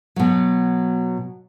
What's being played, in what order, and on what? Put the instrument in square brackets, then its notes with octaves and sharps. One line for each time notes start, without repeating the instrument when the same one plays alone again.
[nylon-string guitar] B2 F#3